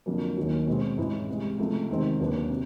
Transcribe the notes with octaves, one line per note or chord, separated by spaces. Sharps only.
F2 D3 F#3 A#3
D#2 D#3 F#3
B2 G#3 C4
G#2 E3 G#3 C#4 E4
C2 C3 E3 G#3
C#2 C3 F3 A3
E2 C3 D#3 G#3 C4
D#2 D3 F#3 B3 D4
C3